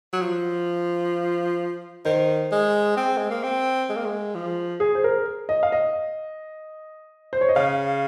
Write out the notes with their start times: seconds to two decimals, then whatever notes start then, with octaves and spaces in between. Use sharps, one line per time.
0.13 F#3
0.21 F3
2.05 D#3 C5
2.52 G#3
2.97 C4
3.17 G#3
3.30 A#3
3.43 C4
3.89 G#3
3.97 A#3
4.06 G#3
4.35 F3
4.80 G#4
4.95 C5
5.04 A#4
5.49 D#5
5.63 F5
5.72 D#5
7.33 C5
7.41 C#5
7.49 D#5
7.56 C#3 F5